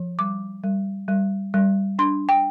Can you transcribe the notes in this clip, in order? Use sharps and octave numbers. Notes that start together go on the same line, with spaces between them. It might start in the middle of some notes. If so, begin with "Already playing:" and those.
Already playing: F3
G3 D6
G3
G3
G3
D4 C6
G5